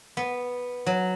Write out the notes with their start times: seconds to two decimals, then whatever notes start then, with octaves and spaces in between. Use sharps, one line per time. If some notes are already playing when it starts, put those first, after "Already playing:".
0.17 B3
0.86 F#3